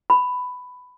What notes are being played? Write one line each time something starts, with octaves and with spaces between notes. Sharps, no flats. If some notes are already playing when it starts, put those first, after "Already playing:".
B5